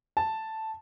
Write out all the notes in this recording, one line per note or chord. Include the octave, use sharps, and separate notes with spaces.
A5